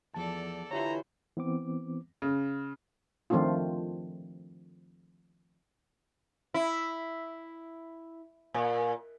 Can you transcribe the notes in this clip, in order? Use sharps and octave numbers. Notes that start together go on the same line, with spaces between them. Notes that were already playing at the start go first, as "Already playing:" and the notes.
E2 F3 A4 D5 A5
D3 E3 E4 F4 G4 C5 C#5 A#5
E3 B3 C4 D6
C#3
D#3 F3 A3 C4 D4 F4
E4
A#2